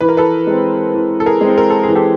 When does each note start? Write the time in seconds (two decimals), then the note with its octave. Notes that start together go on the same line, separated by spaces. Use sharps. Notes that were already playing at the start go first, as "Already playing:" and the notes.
0.01 E3 B4
0.09 A#4
0.17 A4 B4
0.47 G#3 C4
0.94 E3
1.20 A4
1.26 G#4 A#4
1.41 G#3 C4
1.58 A#4
1.70 A4
1.83 E3 G#4
1.95 G4 A4